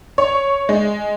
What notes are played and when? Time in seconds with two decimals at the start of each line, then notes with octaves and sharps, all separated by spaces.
0.18 C#5
0.69 G#3